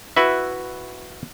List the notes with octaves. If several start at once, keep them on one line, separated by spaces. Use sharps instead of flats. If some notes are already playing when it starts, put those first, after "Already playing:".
E4 F#4 B4 E5